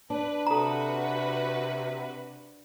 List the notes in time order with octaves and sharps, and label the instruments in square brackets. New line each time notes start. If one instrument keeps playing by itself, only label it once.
[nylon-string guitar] D4 [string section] B4
[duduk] C3 [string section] F#4 B4 [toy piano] A4 A#5